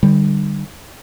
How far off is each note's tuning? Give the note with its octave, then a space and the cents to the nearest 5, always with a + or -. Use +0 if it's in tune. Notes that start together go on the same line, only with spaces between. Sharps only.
D3 +45 G3 +10